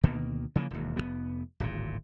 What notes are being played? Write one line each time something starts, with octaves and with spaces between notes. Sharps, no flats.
D2 B2 D#3 A#3
C#3 E3 F3 A#3
E1 D#2
F1 F#2 B3
D1 G#1 A#2